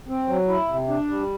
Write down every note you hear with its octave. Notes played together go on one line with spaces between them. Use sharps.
C4
F#3
E4
C3
D4
G3